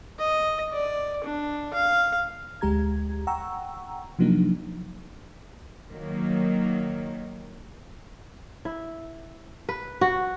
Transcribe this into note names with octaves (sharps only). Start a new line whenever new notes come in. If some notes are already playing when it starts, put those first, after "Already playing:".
D#5
D5
D4
F5
D2 G#3 G4 A#5 G#6
F#5 G5 A#5 C#6 E6
C3 F3 F#3 A#3 D4 D#4
D#3 F#3 A#3
E4
B4
F#4